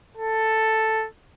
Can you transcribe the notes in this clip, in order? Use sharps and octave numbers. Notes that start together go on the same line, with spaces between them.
A4